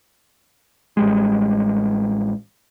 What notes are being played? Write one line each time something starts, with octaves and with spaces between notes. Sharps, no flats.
A1 G3 G#3